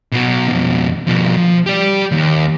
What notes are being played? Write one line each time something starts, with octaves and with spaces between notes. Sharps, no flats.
B2 F#3
F2 B2
B2 F3
F3
G4 D5
D#2